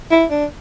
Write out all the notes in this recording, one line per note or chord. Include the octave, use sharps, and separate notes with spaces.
E4
D4